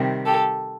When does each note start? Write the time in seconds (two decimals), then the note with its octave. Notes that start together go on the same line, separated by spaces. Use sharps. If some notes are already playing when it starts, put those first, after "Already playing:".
Already playing: C3 D#3 G3
0.26 G4 A4